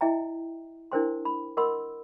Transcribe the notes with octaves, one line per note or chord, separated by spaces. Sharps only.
E4 D#5 E5 G5 A#5
D4 E4 A#4 C5 G5 C6
B5
A#4 D#5 F#5 B5 C6 E6